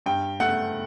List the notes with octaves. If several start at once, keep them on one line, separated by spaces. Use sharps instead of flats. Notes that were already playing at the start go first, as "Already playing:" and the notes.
G2 G5
A3 F#5